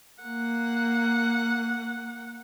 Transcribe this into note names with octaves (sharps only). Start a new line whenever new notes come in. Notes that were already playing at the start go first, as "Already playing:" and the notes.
A#3 F#5